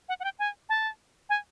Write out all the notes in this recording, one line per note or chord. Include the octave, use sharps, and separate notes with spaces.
F#5
F#5
G5
G#5
A5
G#5